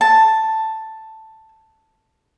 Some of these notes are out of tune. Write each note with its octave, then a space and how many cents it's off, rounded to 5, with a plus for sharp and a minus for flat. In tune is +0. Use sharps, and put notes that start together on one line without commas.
A5 +5